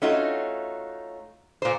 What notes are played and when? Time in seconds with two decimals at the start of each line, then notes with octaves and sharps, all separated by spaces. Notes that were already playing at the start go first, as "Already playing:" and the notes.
0.02 A3 C#4 D#4 F4 F#4
1.62 A#2 C5